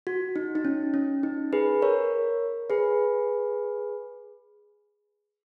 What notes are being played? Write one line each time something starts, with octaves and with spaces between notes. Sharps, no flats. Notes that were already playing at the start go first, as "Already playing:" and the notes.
F#4
D#4
D#4
C#4
C#4
D#4
G#4 B4
A#4 C#5
G#4 B4